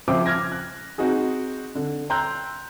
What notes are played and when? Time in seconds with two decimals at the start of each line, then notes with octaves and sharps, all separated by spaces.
0.08 C#3 F3 C5 E5 G5 D6
0.26 D6 F6 G#6 A#6
0.52 F#6
0.98 C4 D#4 F#4 G#4
1.75 D3
2.10 G5 A#5 C6 E6 F#6 G6